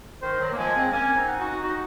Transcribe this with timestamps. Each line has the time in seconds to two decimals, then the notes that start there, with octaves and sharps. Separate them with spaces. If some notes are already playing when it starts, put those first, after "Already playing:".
0.22 D#3 C5
0.40 D#3 F#3
0.52 A#3
0.57 F3 G#3 G#5
0.75 G#3 C4
0.92 A#3 C#4 G#5
1.15 C4 D#4
1.27 F#5
1.39 D#4 F#4
1.63 D#4 F#4